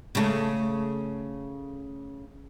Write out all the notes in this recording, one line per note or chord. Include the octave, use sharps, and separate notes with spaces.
C#3 A3